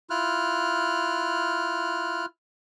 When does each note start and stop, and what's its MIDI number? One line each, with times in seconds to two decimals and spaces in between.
0.10 2.26 64
0.10 2.26 65
0.10 2.26 89
0.10 2.26 90